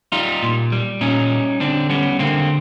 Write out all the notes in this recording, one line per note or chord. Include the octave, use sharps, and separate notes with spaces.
G3 D#4 F4
A#2
G3
A#2 C#4 D#4
G3
D3 C4 D4
G3 B3 C#4
D3 A#3 C4